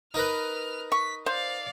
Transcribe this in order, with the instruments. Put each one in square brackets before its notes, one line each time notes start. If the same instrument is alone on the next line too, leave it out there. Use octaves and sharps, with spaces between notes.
[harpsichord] D#4 A#4 B4 [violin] F6
[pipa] C#6 [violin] B6
[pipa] C5 [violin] D5 F5